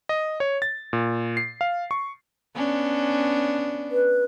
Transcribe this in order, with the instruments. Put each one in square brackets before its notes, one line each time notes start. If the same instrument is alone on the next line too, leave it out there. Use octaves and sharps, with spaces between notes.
[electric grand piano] D#5
C#5
A6
A#2
C7
F5
C#6
[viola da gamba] B3 C#4 D4
[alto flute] B4